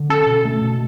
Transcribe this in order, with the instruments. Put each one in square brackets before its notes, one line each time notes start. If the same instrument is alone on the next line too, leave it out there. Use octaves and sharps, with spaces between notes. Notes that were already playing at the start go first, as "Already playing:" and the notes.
Already playing: [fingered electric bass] D3
[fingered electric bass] C#4 [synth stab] A4
[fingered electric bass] B2
A3
B2